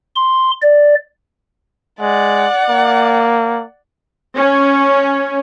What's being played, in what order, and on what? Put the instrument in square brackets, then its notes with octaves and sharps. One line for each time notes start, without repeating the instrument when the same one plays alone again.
[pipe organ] C6
D5
[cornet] G#3 [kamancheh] D5 F#5
[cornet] A#3
[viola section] C#4